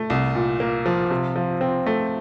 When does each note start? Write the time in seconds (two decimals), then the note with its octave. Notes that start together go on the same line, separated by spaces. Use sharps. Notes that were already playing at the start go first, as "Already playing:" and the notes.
Already playing: A3
0.10 C2
0.35 A#2
0.60 A#3
0.86 F3
1.11 C3
1.36 F3
1.61 C4
1.86 A3